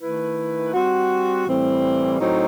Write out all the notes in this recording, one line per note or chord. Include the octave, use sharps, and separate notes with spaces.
D#3 A3 E4 B4
G3 C4 F#4
A2 E3 G3 C4
A2 F#3 C4 D#4